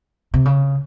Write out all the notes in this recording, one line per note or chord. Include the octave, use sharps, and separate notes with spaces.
C3
C#3